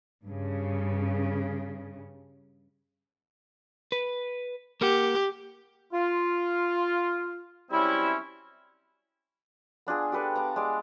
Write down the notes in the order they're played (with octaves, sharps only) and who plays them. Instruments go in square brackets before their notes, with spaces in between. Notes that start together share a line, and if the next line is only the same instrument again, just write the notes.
[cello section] G2 C#3
[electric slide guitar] B4
[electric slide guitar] A#3 A#4 F#5 [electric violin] G4
[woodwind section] F4
F#3 G3 C4 C#4 E4
[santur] B3 D4 F4 G#4
G4 A4 B4 D5
B3 A5 A#5
G#3 D5